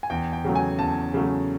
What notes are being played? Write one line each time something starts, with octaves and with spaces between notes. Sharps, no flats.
G#5
E2 G5
G5
C#3 F#3 A3
G#5
E2 A5
C#3 F#3 A3